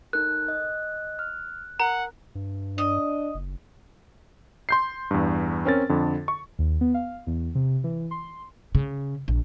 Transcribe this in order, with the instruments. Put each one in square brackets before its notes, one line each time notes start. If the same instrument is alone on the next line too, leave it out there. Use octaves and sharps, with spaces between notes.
[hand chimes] D#4 A4 A#4 [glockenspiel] F#6
[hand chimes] D#5
F6
[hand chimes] A#4 [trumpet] F#5 [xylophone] A#5
[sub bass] G2
[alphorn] D4 [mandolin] D#5
[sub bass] F#1
[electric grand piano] C6 G6 C7
E2 G2
C4 C#4 A#4 A6
F2 D3
C#6
[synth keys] D#2
B3
F5
E2
C3
E3
C6
[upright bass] C#3
A#1